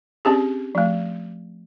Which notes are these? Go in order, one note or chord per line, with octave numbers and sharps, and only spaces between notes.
C4 C#4 G4 G#4
F3 A3